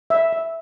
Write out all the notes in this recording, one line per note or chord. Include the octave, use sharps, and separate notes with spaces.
E5
E5